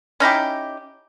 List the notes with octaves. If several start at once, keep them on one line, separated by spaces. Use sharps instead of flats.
C#4 D#4 E4 G4